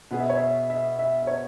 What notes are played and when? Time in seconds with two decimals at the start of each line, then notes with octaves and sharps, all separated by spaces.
0.11 B2 B3 G#4 F#5
0.20 E5
0.29 C#5
0.37 E5
0.70 E5
0.99 E5
1.23 E5
1.27 C#5